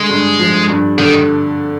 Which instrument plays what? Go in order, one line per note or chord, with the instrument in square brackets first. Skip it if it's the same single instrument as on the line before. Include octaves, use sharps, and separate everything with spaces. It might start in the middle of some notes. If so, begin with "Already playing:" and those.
Already playing: [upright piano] D3 [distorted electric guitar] G#3
[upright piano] G2
F3
G2
[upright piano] D3 [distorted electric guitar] D#3